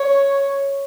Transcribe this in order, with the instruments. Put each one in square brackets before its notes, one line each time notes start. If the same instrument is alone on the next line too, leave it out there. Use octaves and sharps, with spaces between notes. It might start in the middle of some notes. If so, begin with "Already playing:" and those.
Already playing: [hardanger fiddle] C#5